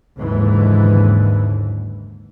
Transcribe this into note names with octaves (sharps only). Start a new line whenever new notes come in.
F#1 D#2 G#2 D3 E3